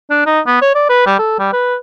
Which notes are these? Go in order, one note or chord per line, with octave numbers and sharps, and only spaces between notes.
D4
D#4
B3
C#5
D5
B4
G3
A4
G3
B4